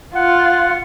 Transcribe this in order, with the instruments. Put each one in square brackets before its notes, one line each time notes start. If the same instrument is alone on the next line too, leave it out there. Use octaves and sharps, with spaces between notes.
[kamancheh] F4 [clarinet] F#5